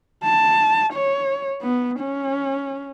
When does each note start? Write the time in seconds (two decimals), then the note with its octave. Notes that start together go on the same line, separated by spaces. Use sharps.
0.23 A5
0.93 C#5
1.62 B3
1.99 C#4